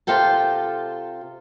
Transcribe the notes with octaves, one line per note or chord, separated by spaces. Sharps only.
C3 F4 A4 G5 A5